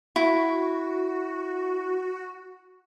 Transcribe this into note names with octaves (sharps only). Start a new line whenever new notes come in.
E4 F#4